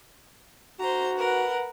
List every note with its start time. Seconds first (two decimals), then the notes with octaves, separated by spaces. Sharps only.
0.79 F#4 C5 A#5
1.17 A#4 B4 F#5